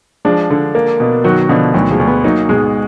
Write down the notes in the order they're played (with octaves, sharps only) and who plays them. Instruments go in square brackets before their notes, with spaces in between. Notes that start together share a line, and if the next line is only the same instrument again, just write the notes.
[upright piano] F3 G#3 [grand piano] D4
[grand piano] D3
A#3
B2
[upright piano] D#3 F#3 [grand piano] F#4
[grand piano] B2 [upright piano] D3 F3
[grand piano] D2 [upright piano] D#3 F#3
[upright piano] F3 G#3
[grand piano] D2
[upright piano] G#3 B3
[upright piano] F#3 A#3 [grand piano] D#4
[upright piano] G#2 B2 [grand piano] G#3